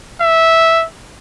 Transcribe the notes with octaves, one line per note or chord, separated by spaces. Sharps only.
E5